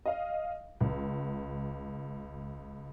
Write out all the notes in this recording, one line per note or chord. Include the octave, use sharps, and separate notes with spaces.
D#5 F5
C#2